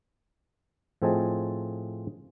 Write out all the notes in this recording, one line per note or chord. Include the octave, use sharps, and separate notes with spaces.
A2 F3 C4 G#4 D#5 A5